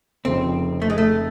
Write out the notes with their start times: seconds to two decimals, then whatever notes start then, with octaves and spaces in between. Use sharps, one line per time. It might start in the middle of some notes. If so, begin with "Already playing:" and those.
0.25 F1 F2 C#3 F3 C4
0.82 A3
0.90 G#3
0.98 A3